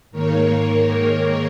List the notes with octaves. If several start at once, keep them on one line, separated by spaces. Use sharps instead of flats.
G#2 D#3 A#3 A#4 C#5